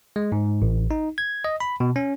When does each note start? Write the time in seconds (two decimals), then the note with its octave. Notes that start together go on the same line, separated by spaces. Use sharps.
0.16 G#3
0.32 G#2
0.62 A1
0.91 D#4
1.18 G#6
1.45 D#5
1.60 B5
1.80 B2
1.96 C#4